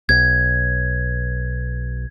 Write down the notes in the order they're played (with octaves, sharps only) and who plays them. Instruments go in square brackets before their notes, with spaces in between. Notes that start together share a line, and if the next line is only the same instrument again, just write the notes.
[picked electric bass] B1 [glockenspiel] G#6